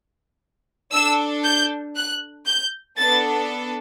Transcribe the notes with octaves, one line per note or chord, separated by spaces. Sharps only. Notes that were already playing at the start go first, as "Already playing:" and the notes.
D4 A4 E6
G6
F#6
G6
B3 D4 A4 A6